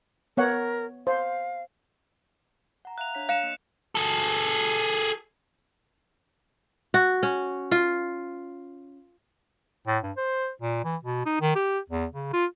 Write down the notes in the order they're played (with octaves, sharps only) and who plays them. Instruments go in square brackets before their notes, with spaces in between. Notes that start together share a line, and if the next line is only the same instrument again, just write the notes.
[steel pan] B3 C#5 F#5 [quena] A#4
[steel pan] C5 [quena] F5
[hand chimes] F#5 A#5
[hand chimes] E5 F5 A#5 [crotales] F#6 F7
[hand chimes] D4 C#5 B6
[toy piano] F5 [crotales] F#6 C#7 E7
[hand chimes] A#3 D#5
[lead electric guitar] G#4 A4
[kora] F#4
C#4
F4
[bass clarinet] A2
G2
C5
A#2
E3
B2
D#4
D#3
G4
E2
C#3
F4